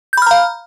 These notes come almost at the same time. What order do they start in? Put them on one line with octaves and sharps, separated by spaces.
G6 B5 F6 A#5 F5